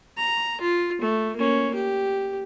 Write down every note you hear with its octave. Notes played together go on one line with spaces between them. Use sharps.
A#5
F4
A3
A#3 C#4
G4